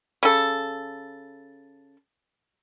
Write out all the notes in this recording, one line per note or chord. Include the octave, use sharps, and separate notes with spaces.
C#3 A4